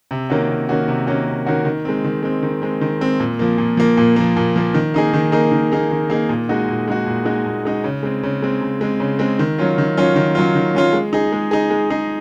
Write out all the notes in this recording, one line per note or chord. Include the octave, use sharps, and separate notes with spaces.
C3
D#3 A#3 C#4 F#4
C3
D#3 A#3 C#4 F#4
C3
D#3 A#3 C#4 F#4
C3
D#3 A#3 C#4 F#4
D#3
G#3 C4
D#3
G#3 C4
D#3
G#3 C4
D#3
G#3 C4
A#2
F3 A#3
A#2
F3 A#3
A#2
F3 A#3
A#2
F3 A#3
D#3
A#3 D#4 G#4
D#3
A#3 D#4 G#4
D#3
A#3 D#4 G#4
D#3
A#3 D#4 G#4
A#2
G#3 D#4 F#4
A#2
G#3 D#4 F#4
A#2
G#3 D#4 F#4
A#2
G#3 D#4 F#4
C#3
G#3 C4
C#3
G#3 C4
C#3
G#3 C4
C#3
G#3 C4
D#3
F#3 C#4 F4
D#3
F#3 C#4 F4
D#3
F#3 C#4 F4
D#3
F#3 C#4 F4
G#3
D#4 G#4
G#3
D#4 G#4
G#3
D#4 G#4